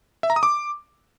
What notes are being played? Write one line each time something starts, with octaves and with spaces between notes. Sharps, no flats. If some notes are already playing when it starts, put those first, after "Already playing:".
E5
A#5
D#6
D6